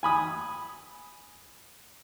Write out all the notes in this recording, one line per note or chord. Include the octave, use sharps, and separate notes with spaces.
G#5 B5 D#6